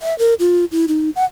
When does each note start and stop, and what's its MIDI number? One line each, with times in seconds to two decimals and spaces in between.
0.01 0.17 76
0.19 0.34 70
0.40 0.65 65
0.72 0.86 64
0.88 1.10 63
1.16 1.24 78